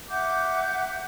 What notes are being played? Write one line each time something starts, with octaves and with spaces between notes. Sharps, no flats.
E5 F#5 D6 G6